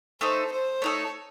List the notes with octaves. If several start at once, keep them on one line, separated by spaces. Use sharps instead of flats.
A3 D#4 A4 C5
C5
A3 D#4 A4 C#5